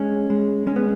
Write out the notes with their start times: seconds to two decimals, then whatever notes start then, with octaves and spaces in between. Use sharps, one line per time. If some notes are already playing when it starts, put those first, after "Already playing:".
Already playing: G#3 C#4
0.30 G#3
0.67 G#3 C#4
0.76 B3